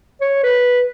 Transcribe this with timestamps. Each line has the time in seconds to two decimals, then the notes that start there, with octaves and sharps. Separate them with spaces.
0.21 C#5
0.44 B4